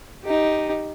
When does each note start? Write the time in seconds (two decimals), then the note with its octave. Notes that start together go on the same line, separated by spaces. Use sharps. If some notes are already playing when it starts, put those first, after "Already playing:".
0.24 D#4 G4